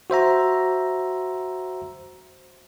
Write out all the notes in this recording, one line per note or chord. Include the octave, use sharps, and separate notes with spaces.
F#4 C5 E5 A#5